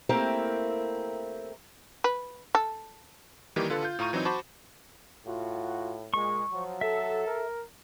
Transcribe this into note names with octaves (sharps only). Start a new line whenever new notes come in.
A3 A#3 C4 E4 G4 A#4
B4
A4
D#3 E3 G3 A#3 G4
D3 F4 A4 B4
F4 G6
A2 F4 A#5 C#6 D#7
E3 F#3 C4 D#4
F#4 C5 A5 B5 C#6 D6
A2 F4 F#4
A#2 G#3 C#6
F3 F#3
A4 E5
A#4